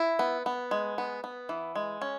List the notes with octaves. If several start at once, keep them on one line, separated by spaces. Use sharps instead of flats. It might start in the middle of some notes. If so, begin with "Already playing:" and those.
Already playing: E4
B3
B3
G#3
B3
B3
E3
G#3
C#4